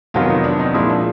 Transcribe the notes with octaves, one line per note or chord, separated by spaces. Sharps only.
F2 C3 D#3 F#3 B3 F4
D#4
D4
D#4
A#2 F3 G#3 E4
D4